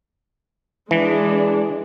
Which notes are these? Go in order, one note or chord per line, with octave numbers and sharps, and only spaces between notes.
E3 G#3 D4